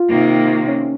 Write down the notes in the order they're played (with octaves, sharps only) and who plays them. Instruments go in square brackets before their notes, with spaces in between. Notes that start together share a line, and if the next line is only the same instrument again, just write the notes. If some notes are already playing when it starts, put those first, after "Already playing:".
Already playing: [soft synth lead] F4
[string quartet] C3 D#3 A#3
[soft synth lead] C#4